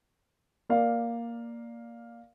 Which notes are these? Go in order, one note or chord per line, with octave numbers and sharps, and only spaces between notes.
A#3 D5 F5